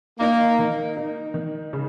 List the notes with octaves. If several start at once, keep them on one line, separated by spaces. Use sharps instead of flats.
A#3 D#4
D#3
D#4
D#3
C#3